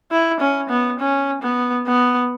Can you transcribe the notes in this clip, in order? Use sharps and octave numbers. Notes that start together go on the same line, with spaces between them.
E4
C#4
B3
C#4
B3
B3